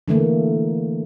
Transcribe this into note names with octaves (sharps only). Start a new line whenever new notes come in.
D3 E3 A3 A#3